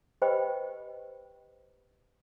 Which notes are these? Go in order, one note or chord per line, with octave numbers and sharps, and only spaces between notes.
G4 B4 C5 D#5 G5 B5